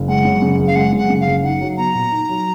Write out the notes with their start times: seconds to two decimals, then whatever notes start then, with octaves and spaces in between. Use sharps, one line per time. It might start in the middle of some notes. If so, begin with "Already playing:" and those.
Already playing: F#1
0.08 G#3 F#5
0.25 F#2
0.42 C#3
0.59 F#1
0.67 F5
0.75 G#3 F#5
0.92 F#2
0.98 F#5
1.10 C#3
1.21 F5
1.27 F#1
1.44 D#4 F#5
1.61 F#3
1.77 B3 A#5
1.95 A#2
2.12 D#4
2.29 F#3